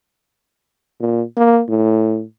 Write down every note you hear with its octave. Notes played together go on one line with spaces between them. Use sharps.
A#2
A#3
A2